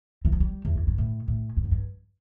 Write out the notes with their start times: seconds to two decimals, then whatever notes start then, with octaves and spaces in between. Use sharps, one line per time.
0.25 E3
0.32 F#3
0.40 G3
0.65 E2
0.76 F#2
0.87 G2
0.98 A2
1.28 A2
1.57 G2
1.64 F#2
1.71 G2